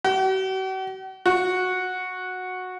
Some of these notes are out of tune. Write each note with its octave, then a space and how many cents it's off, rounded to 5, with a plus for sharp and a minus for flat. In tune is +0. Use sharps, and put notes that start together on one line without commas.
F#4 +45
F#4 -10